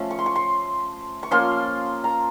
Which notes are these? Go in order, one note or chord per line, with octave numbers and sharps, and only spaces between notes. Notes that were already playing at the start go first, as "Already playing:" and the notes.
Already playing: F3 A3 C#4
C#6
C6
C#6
C6
C#6
F3 A#3 C#4 F4 C6
A#5